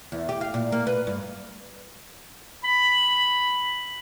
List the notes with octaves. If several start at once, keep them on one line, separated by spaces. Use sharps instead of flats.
E2
G4
F5
A#2
A#3
B4
G2
B5